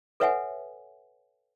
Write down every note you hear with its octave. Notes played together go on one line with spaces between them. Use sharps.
A4 B4 C#5 E5 F#5 G#5